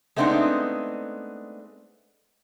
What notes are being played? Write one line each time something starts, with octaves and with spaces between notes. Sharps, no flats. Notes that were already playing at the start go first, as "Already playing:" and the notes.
G#3 A3 B3 C4 D4 D#4